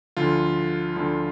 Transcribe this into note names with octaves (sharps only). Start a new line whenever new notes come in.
D2 D3 F3 F4
D2 D3 F3